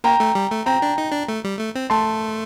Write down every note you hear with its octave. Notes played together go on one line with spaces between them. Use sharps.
A#3 G5 A#5
A3
G3
A3
C4 G5 A#5
D4
D#4
D4
A3
G3
A3
C4
A3 A5 C6